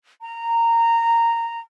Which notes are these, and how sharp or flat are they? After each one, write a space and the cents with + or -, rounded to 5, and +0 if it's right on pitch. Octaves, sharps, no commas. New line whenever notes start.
A#5 -15